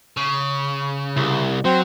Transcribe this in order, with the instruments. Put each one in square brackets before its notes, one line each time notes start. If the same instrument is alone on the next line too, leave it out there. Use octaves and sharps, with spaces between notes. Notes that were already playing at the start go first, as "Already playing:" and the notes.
[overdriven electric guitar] C#3
[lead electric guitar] C2
[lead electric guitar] F#3 [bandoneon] C4 C5